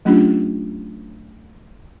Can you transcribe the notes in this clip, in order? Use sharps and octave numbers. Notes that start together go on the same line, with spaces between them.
F#3 A3 C#4 D4 F4 G4